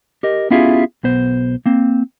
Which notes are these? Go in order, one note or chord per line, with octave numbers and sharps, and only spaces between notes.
G4 A#4 D#5
B3 C#4 E4 F4 G4 G#4
B1 B3 C5
A#3 C4